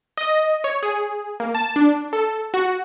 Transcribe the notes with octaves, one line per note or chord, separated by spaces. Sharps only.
D#5
C#5
G#4
A#3
A5
D4
A4
F#4